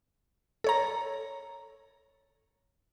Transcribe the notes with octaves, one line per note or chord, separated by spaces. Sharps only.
A4 C#5 A#5